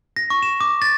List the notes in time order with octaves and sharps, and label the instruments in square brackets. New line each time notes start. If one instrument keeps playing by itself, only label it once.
[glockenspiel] A#6
C#6
E7
D6
A6